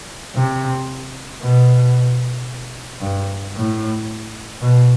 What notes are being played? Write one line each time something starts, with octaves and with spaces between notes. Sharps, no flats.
C3
B2
G2
A2
B2